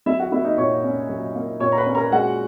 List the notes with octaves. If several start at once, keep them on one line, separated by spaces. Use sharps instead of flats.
F#3 E4 E5
F#4 F#5
A#3 E4 E5
D#4 D#5
A#2 C#5 C#6
C#4
F#3
A#3
A#2 C#5 C#6
A#5
B4 B5
C#4
A#4 A#5
G#3 F#4 F#5